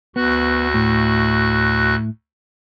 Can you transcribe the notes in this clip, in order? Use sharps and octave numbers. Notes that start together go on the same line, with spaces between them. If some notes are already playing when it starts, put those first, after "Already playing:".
D2 B3 F#4 F#6
A2